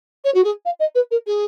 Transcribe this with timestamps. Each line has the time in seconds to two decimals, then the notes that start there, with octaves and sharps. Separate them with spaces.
0.25 C#5
0.35 F#4
0.44 G#4
0.65 F5
0.80 D#5
0.95 B4
1.11 A#4
1.27 G#4